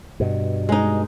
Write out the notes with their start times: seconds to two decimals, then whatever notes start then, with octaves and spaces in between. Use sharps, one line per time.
0.20 G2 B2
0.69 G#3 D#4